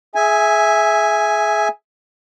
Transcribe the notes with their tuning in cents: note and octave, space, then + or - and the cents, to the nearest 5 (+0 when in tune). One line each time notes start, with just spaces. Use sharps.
G#4 +20 E5 +0 G#5 +0